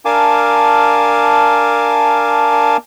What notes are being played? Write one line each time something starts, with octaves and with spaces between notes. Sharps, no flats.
D4 A#4 F5 G#5 A5 D6